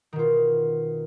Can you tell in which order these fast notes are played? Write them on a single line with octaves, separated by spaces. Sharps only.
D#3 B2 F4